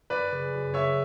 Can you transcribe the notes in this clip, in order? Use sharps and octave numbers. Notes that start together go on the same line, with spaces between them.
F#2 B4 D5
C#3
F#2
G#3 C#5 E5